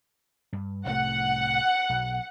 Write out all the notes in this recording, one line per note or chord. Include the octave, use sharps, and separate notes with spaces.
G2
C2 A2 A3 F#5
B1